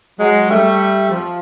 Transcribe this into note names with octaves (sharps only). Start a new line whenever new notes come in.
F#3 G#3
G3 A3
F3